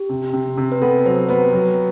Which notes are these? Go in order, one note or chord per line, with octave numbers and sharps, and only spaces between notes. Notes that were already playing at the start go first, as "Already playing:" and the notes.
Already playing: G4
C3
C3
C3
B4
B3 A4
F#3 C5
B3 B4
F#3